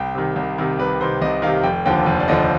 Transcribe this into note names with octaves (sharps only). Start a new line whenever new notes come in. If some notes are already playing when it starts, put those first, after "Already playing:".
Already playing: C2 G5
C3 D#3
C2
C3 D#3
C2 B4
C3 D#3 C5
C2 D#5
C3 D#3 F5
F1 G5
D#2 D3 F3 G5
F1
D5
D#2 D3 F3 D#5